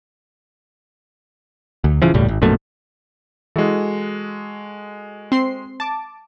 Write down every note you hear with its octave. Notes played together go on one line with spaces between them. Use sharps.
D2
D#1 C#3 E3 F3
E1 C#2 A2 G3
G#1
A#1 F#2 B2 A3
E3 G#3 F#4 A4
C4 C6 C7
A5 D6